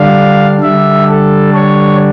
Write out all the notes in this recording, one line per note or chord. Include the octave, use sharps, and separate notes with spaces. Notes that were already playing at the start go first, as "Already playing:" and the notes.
Already playing: D3 G3 D4 F5
D3 G3 D4 E5
A4
C#5